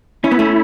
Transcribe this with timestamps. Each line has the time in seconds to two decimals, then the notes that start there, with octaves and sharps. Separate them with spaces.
0.24 C#4 E4
0.31 B3
0.39 A3 C#4